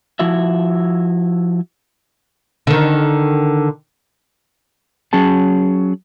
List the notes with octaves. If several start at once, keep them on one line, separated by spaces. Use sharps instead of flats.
F3 E4 F#4 E5
D3 D#3
F#3 C#4 G#4 A5